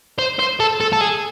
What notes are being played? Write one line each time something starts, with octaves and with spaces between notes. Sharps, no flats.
C5
C5
A4
A4
A4
G#4